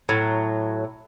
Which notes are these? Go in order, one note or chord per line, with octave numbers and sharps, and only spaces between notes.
A2 F#3